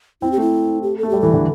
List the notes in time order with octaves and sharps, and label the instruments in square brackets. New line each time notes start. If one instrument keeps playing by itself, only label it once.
[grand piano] C4 [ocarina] E4
[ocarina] G4
[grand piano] A3 [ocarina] E4
[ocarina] G4
A4
[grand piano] A3
[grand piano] G3 [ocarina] G4
[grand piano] E3 [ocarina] A4
[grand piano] D3